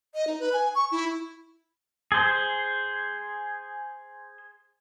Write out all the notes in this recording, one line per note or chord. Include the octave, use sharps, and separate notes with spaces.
D#5
D#4
B4
G#5
C#6
E4
G#4 C5